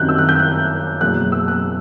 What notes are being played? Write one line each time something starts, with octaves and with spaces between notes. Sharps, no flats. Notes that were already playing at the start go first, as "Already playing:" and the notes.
Already playing: F#2 D#3 G3 C4 D#4 F#6 G6
E6
F#6
G6
F#6
F#1 E2 B2 F#6
E6
F#6